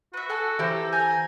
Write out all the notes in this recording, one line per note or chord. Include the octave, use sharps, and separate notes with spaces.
F#4 B4 E5
A4 F#5 G#5 A5
E3 G4 C5 A#5
G#5 A#5 G6